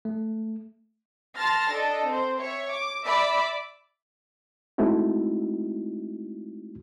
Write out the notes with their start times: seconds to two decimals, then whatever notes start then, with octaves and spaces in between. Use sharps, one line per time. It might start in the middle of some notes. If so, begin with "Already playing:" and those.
0.05 A3
1.37 A5 C6 F6 A6 A#6
1.71 D4 A4 D#5
2.08 C4 C5
2.39 C#5 E5
2.70 D6
3.05 D5 E5 B5 D6
4.78 G#3 A3 C4 D#4 E4 F#4